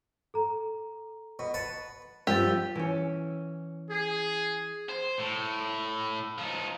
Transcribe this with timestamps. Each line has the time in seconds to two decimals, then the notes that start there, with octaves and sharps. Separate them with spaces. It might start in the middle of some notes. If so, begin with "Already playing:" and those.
0.34 A4 A#5
1.39 B2
1.54 B4 F#5 A5
2.27 G2 F3 G4 E6 G6 A6
2.75 E3 C#4
3.91 G#4
4.89 C5
5.18 A2
6.38 F3 D#4